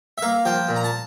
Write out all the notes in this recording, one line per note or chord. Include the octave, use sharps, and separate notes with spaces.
E5
A#3 F5
F3 G5
A#2
A#5
A5